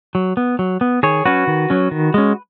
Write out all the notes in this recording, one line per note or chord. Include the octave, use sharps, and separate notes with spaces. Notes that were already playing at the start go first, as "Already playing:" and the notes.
F#3
B3
F#3
B3
D#3 G#4 C#5
F#3 C#4 F#4 B4
D#3
F#3 C#4
D#3
G#3 C#4